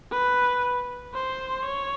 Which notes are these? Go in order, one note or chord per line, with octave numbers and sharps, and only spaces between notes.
B4
C5
C#5